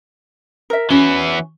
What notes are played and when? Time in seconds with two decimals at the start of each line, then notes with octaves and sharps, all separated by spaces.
0.70 A#4 E5
0.90 E3 B3 C#4 F#4